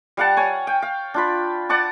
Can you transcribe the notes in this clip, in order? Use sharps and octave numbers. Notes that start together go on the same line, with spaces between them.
G3 F5 F#5 A5
C#5 G#5
G5
F5
D4 F4 B5
D5 F#5 A5 D6